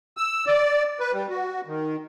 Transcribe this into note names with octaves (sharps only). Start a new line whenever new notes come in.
E6
D5
B4
G3
F#4
D#3